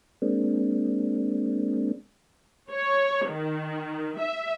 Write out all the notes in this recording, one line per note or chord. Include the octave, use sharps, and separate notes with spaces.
G#3 A#3 C4 D4
C#5
D#3
E5